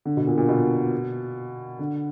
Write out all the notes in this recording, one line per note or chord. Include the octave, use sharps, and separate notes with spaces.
D3
B2
A#2
A#2
B2
D3